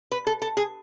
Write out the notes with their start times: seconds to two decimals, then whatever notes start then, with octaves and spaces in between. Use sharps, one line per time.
0.12 B4
0.27 A4
0.42 A4
0.57 G#4